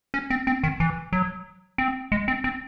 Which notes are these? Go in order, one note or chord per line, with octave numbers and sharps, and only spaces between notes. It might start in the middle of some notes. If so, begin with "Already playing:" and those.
C#4
C4
C4
D#3
E3
F#3
C4
G#3
C4
C4